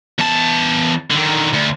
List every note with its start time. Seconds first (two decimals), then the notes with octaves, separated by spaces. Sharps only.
0.19 E2 A5
1.11 D3 D#3
1.54 D2